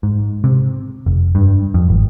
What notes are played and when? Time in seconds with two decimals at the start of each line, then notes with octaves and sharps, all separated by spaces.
0.03 G#2
0.44 C3
1.06 F1
1.35 G2
1.74 F2
1.89 G#1